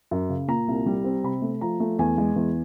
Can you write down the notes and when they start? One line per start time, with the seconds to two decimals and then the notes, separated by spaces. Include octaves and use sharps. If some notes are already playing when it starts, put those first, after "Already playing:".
0.11 F#2
0.29 C#3
0.48 A#2 A#5
0.68 C2
0.86 G3
1.04 C4
1.24 C3 B5
1.42 A3
1.61 F3 A#5
1.80 A3
1.99 E2 G#5
2.18 G#3
2.36 E2